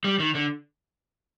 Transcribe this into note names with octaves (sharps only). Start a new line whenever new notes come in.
G3
D#3
D3